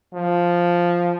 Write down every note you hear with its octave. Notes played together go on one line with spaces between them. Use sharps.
F3